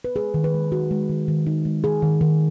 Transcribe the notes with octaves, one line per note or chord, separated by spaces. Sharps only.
B4
G#3 G#4
D#3
B4
G#3
D#4 F#4
G#3
D#3
D#3
D#4
G#3
D#3 G#4
D#3
D#3